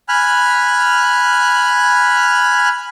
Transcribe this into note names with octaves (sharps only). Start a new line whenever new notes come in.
G#5 B5 F6 F#6